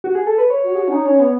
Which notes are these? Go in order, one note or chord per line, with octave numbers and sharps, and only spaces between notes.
F#4
G#4
A4
B4
C#5
F#4
G#4
F#4
C#4
D#4
C#4
B3